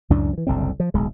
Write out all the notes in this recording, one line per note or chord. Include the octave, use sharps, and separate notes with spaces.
C#2 F#2 A2 D4
E3 F3
F#1 C2 D3 C4
F3
D1 B1 G#3